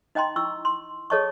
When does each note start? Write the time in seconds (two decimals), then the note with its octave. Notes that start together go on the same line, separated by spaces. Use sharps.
0.15 D#4 D#5 G5 A#5 C6
0.36 E4 C#6 E6
0.65 C6
1.10 G#4 A4 C#5 D#5 A5 C#6